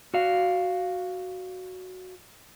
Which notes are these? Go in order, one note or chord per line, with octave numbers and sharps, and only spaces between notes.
F#4 D5 F5